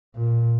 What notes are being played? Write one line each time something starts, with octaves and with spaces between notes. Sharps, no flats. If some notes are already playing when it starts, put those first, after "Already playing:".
A#2